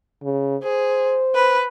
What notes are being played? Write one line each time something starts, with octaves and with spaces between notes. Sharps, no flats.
C#3
G#4 C5
B4